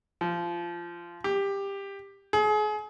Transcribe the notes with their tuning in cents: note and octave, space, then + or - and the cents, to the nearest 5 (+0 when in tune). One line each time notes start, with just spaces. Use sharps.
F3 -20
G4 +15
G#4 +35